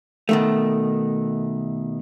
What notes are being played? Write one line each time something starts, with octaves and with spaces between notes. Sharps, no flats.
B2 D#3 A3